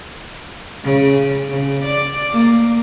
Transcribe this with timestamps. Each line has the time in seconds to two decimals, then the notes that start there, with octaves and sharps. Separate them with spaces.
0.84 C#3
1.50 C#3
1.84 D5
2.32 A#3